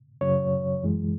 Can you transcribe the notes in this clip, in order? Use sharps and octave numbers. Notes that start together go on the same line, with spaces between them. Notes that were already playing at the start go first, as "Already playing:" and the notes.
F#2 C#3 F#3 C#5
F#2 E3 G#3